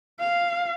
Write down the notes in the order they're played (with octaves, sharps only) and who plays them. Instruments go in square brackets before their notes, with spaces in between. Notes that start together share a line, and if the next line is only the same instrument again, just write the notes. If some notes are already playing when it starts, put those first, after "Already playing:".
[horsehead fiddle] F5